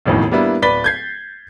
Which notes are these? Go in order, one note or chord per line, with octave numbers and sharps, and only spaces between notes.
E1 A1 F2 A2 D#3
G3 A#3 B3 D4 E4
D1 B4 D5 A6 B6 G7
G6 G#6 C7